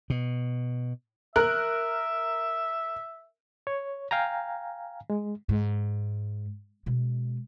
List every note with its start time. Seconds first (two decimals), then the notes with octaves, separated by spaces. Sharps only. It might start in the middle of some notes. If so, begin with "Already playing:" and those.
0.10 B2
1.36 A#4 E5 F#6
3.67 C#5
4.11 F5 G5 G#5 A#5
5.10 G#3
5.49 G#2
6.86 B2 G#3